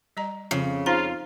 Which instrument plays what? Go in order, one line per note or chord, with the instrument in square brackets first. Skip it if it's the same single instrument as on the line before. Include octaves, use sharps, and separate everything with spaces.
[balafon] G3 D#5 A#5
[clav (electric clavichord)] F2 [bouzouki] C#3
[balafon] D#4 C5 A#5 [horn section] F4